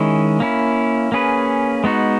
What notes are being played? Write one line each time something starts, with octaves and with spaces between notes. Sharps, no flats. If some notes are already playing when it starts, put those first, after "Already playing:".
Already playing: D#3 G#3 C#4 E4
A#3 C#4 E4
A#3 C#4 G#4 B4
G#3 B3 D#4 F#4